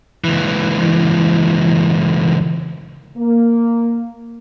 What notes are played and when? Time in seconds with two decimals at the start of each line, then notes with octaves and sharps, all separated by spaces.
0.24 C#2 E3
3.17 A#3